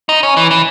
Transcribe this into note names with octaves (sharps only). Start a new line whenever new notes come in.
D#4
C#4
E3
E3